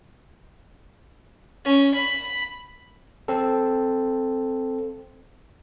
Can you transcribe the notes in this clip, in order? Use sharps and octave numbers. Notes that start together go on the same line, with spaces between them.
C#4
B5
C4 A4